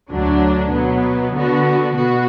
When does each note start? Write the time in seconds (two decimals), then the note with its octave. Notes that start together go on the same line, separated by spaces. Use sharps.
0.11 D2 D3 F#3 D4
0.73 B2 F#3 B3
1.34 D3 B3 F#4
1.95 B2 B3 F#4